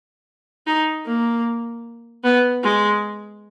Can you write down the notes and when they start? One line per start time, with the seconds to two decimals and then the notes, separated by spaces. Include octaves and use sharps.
0.66 D#4
1.06 A#3
2.24 B3
2.63 G#3